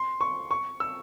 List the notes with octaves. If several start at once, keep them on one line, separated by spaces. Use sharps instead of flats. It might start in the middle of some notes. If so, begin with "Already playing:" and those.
Already playing: C6
C#6
C#6
E6